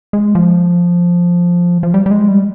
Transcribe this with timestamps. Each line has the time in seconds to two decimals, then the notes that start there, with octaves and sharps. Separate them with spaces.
0.13 G#3
0.35 F3
1.83 F3
1.94 G3
2.06 G3
2.11 G#3
2.28 G3